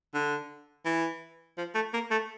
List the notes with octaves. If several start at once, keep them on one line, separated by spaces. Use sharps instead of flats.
D3
E3
F3
A3
A#3
A3